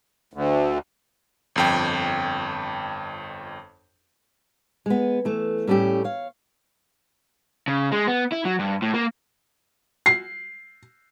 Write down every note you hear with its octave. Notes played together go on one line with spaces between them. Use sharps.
D2
G1 F2 G5
G#3 B3
E3 A3
A2 G3 A3 C#4 G4
C#5 F5
C#3
G#3
B3
E4
F#3
G2
A2
A#3
C7